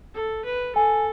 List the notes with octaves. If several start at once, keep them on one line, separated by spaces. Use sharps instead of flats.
A4
B4
A4 G#5